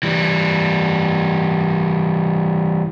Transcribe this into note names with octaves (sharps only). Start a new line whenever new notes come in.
E3 G3